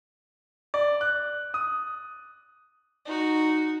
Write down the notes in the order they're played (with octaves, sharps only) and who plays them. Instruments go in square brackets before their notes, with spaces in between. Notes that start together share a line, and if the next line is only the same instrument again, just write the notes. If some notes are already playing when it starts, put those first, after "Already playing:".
[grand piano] D5
F#6
D#6
[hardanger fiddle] D#4 F#4